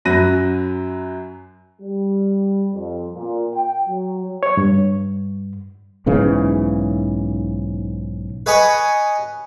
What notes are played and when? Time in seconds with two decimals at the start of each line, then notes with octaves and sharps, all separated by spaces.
0.05 F#2 F#3 B5 F#6 A#6 D#7
1.81 G3
2.73 F2
3.14 A#2
3.54 G5
3.88 F#3
4.43 C#5
4.57 G2
6.06 B1 G#2 C#3 E3
8.46 B4 C#5 D#5 G#5 B5 C#6